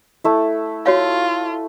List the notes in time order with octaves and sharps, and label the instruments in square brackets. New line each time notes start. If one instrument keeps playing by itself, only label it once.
[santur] A3 E4
[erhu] F4 [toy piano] F#4 C#5 F5